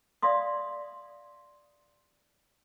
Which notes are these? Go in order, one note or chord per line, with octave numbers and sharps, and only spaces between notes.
D5 E5 F5 C6 D#6